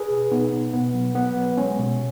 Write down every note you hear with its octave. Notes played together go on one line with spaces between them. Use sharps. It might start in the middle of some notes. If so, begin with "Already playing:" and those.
Already playing: G#4 B4
B2
B2 B3 D#4
B2
B2 B3
F#3
F#3 B3
F#3
G#3 C#4
B2